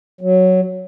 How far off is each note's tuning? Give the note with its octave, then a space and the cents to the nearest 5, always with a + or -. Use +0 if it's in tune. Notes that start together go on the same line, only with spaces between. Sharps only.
F#3 +0